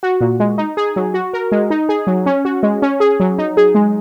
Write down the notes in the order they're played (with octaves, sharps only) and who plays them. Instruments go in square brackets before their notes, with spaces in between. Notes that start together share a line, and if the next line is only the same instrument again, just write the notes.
[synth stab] F#4
A#2
G#3
D#4
G#4
F#3
F#4
A#4
G#3
D#4
G#4
F#3
C#4
F#4
G#3
C#4
G#4
F#3
D#4
G#4
G#3